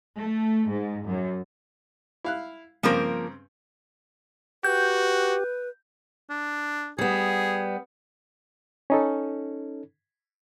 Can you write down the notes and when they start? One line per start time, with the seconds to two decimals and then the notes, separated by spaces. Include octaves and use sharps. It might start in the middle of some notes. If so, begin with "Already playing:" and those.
0.17 A3
0.70 G#2
1.06 F#2
2.24 E4 F5 F#6
2.83 G2 C#3 F3 A#3 C4 A#4
4.64 F#4 G4 B4 G6
6.30 D4
6.98 G3 B3 G#4
8.90 C#4 D#4 A4